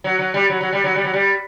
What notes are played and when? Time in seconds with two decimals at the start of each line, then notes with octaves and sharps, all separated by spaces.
0.04 F#3
0.19 F#3
0.34 G3
0.50 F#3
0.61 F#3
0.72 G3
0.84 F#3
0.95 G3
1.04 F#3
1.14 G3